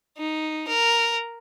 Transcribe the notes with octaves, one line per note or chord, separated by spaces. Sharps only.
D#4
A#4